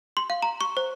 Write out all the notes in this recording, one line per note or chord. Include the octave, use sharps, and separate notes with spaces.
C6
F5
A#5
C#6
C5